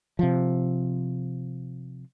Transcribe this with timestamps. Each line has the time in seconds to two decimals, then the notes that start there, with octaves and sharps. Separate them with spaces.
0.19 C3 F3